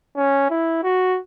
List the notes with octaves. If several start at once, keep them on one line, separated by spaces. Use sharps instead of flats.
C#4
E4
F#4